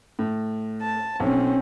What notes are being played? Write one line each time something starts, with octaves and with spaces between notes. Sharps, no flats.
A2
A5
B1 C4 C#4